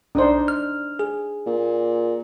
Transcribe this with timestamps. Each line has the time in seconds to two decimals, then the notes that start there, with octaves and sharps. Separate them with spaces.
0.15 B1 D4 D#4 C5 D5
0.48 F6
0.99 G#4
1.47 A#2